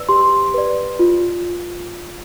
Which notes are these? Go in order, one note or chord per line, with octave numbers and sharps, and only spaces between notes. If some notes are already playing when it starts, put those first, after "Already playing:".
Already playing: B4 D5 E6
G4 C6
B4 D5
F4